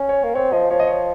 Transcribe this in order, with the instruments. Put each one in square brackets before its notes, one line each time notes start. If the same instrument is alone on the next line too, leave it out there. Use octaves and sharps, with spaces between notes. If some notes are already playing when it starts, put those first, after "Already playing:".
Already playing: [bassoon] C#4
[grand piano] C#5
[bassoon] A#3
[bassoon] C4 [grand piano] C#5
[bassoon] F3 [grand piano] D#5
[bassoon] F3 [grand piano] C#5
[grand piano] D#5
C#5